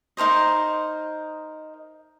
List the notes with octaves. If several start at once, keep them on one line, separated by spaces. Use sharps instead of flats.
D#4 A#4 C5 D#5